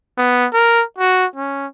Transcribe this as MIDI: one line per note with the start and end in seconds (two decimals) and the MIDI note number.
0.18 0.47 59
0.53 0.83 70
0.98 1.26 66
1.36 1.67 61